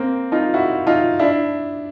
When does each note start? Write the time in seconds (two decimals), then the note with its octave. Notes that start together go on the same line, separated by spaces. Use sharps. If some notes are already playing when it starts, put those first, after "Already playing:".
Already playing: A#3 C4
0.32 D#4 F4
0.54 E4 F#4
0.87 D#4 F4
1.19 D4 E4